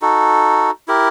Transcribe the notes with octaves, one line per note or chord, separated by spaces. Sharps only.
D#4 F#4 A4
E4 G4 A#4